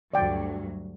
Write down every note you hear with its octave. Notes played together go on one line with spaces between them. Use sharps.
D2 G2 F#3 D5 G5